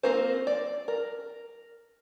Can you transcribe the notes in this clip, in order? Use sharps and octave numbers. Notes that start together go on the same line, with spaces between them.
A#3 C4 F4 A#4 C5
D5
A#4